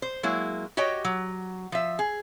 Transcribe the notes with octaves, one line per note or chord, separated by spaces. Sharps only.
C5
F#3 G#3 A#3 E4
F#4 G4 C#5 D#5 G5
F#3
F3 E5
G#4